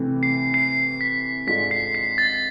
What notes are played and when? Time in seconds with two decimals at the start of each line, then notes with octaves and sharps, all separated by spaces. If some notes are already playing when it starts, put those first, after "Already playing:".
Already playing: C3 E3 A3
0.23 C7
0.54 C7
1.01 B6
1.47 G#2 G#3 D4 F4 A4 B6
1.71 C7
1.95 C7
2.18 A6